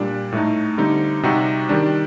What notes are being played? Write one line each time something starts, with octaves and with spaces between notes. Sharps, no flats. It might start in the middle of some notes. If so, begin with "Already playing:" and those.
Already playing: A#2 G3 D4
A2 A3 D#4
D3 G3 C4 D#4
C3 G3 C4 D#4 F#4
D#3 G3 D4